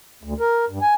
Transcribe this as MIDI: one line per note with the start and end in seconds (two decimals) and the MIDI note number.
0.23 0.34 38
0.40 0.65 70
0.70 0.79 43
0.82 0.94 80